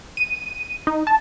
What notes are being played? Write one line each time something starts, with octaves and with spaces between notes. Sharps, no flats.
D#7
D#4
A5